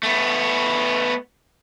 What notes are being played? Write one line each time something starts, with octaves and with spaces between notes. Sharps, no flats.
A3 B3